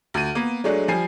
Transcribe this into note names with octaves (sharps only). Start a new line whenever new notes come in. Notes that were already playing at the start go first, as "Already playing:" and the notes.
D2 D#7
A#3 B3
F#3 G#3 A3 D4
F3 G3 G#5 C7